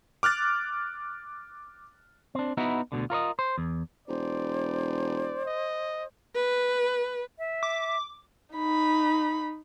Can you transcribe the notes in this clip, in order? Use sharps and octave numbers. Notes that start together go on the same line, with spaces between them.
D6 F6 F#6 A6
C4 D4
B3 D#4 E4 F#4
D2 G2 B2 D3
F4 A#4 C#5 D#5
C5
E2
E1 C5 D5
D#5
B4
E5
D6
D#4 B5